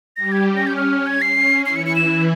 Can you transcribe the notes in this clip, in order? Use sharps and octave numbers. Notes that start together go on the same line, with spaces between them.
G3 G4 A#6
G#6
C#4
A#6
G6
C#4 F6
G#6
C7
C#4
E3 E4 C7
C#7
C#7
E7